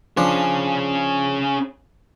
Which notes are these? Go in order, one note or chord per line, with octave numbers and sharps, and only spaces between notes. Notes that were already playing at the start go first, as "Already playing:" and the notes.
F3 C#4 D4 G#4